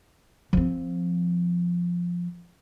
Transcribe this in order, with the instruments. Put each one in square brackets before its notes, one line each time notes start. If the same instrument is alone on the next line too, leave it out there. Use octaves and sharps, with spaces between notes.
[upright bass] F3 C4